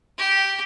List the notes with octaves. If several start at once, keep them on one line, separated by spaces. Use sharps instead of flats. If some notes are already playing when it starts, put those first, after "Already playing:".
G4